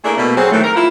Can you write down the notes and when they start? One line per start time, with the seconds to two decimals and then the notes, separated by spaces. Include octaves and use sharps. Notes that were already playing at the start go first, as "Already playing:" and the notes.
0.04 A3 A#3 D4 E4 G#4 A4
0.18 B2 A3 A#3
0.36 F#3 C4 G#4
0.52 A2 D#3 E3 F#3 A3
0.64 A#4
0.76 E4 F4